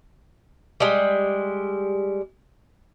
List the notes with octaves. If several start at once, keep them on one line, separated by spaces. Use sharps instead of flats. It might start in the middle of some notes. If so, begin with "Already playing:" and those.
G3 G#3